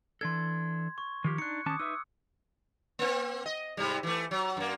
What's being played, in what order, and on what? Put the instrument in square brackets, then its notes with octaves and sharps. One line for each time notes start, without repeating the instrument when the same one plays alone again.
[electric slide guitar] E3 D4 A4 [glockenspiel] C6 G#6
[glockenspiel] C#6
[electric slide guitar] D#3 F3 G4
[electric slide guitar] D4 D#4 [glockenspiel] F#6 C#7
[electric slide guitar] D#3 C#4 A5 [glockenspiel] D6 D#6
[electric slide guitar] D#4 B4 E5 [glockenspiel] E6
[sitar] A#3 C4
D#5
G#2 C3 G3
E3 A3
F#3
F#2 A#3